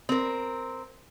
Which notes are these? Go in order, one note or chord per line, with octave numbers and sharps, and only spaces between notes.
C4 A#4